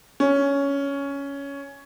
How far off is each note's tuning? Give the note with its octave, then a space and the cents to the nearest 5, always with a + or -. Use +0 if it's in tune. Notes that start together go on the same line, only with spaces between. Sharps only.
C#4 +10